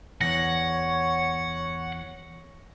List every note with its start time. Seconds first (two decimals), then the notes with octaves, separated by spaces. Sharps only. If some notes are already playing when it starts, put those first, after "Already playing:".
0.21 E2 C#5 F#5 A#6